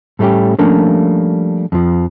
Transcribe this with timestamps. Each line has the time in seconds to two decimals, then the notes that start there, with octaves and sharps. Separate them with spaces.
0.19 A2 G3 A3 C#4 G4
0.59 F3 G3 A3 A#3 C#4 D4
1.72 F2 F3